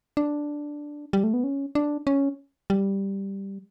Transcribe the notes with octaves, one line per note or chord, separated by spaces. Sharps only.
D4
G3
A3
B3
C#4
D4
C#4
G3